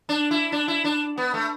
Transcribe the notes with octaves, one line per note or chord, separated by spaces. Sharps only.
D4
E4
D4
E4
D4
B3
A3